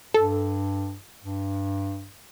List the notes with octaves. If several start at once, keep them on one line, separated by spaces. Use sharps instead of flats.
G2 A4
G2